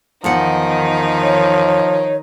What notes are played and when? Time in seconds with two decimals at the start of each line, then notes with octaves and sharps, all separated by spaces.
0.24 E2 D#3 F3 B3 D#4 F#5
1.22 C#5